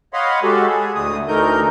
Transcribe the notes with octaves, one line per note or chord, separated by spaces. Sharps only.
C#5 D#5 F5 F#5 B5 C6
G#3 F#4 G4 A4
G#4
D2 A2 D3 A3 D#6
D2 E3 A3 D#4 A#4 G6